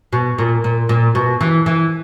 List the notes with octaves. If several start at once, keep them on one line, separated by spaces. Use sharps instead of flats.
B2
A#2
A#2
A#2
B2
E3
E3